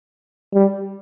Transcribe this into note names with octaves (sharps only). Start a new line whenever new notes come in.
G3